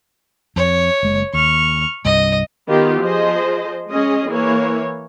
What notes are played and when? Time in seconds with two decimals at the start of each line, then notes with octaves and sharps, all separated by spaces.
0.56 F2 C#5
1.03 F#1 G#3
1.34 D#2 C#6 F6
2.05 C2 G2 D#5
2.68 D#3 B3 F4 G4
3.02 F3 G#4 C5 D#5
3.90 G#3 C#4 G#4 D#5
4.29 E3 A#3 C#5